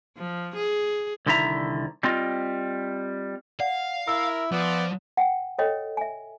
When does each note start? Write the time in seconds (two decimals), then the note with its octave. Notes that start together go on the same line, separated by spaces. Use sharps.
0.17 F3
0.56 G#4
1.26 C2 D3 D#3 E4 E5 A#5
2.03 G3 C4 F4 D#5
3.60 D5 F5 F#5
4.08 E4 A#4 E5 E6
4.52 F3 B3 D5
5.17 F#5 G5
5.59 A4 C#5 D#5 G5
5.97 E5 G#5